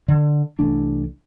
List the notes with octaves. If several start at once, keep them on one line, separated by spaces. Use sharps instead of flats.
D3
C2 E3 A3 D4